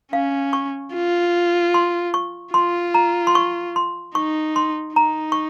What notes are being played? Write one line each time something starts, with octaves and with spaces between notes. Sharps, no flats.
C#4 F5
C#6
F4
C6
C#6
F4 C6
A#5
C6
C#6
C6
D#4 C#6
C6
D#4 A#5
C#6